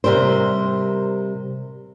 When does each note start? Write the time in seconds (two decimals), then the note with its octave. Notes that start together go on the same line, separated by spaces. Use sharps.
0.04 C3 G3 A#4 C5